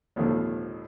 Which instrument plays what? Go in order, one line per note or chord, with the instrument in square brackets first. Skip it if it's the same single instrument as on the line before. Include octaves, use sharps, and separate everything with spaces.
[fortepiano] G#1 D#2 A#2 D3 D#3 F3